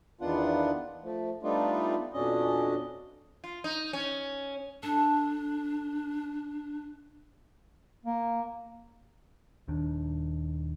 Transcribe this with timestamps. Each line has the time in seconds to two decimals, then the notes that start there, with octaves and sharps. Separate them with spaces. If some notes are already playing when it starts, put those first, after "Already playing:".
0.21 E2 D#3 B3 D4 F4 F#5
1.03 F3 A3
1.43 G3 A3 B3 D4 D#4 F4
2.14 F2 B2 C#4 D4 D#5
3.44 F4
3.64 D#4
3.93 C#4
4.83 D4 A4
8.05 A#3
9.68 D#1 D#2 D#3 D4